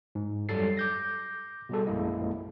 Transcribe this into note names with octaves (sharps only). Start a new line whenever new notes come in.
G#2
F#2 F#3 G3 A4 A6 C7
D6 G6 A#6
B2 G3 G#4 A4
A#1 F#2 G#3 A#3 E4 D#5